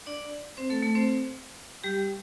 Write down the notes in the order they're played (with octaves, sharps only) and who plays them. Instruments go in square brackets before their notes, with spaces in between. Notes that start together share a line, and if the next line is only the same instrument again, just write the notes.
[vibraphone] D4 D5
C4 C5
A3 A4
A3 A4
C4 C5
G3 G4